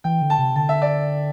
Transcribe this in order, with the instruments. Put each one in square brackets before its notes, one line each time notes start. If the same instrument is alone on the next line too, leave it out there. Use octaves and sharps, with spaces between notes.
[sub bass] E3 [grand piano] G5
[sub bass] D3
[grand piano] A5
[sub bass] C3
[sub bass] D3 [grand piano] A5
[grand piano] E5
D5